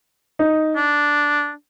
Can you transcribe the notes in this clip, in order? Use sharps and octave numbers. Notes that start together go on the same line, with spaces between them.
D#4
D4